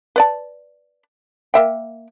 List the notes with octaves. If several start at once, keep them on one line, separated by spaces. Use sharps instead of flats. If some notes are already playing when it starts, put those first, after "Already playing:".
B4 D5 A5
A#3 E5 G5